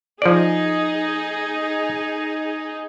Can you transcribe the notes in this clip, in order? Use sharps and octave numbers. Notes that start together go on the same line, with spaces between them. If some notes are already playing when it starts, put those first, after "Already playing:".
F3 D#4 G#4 D5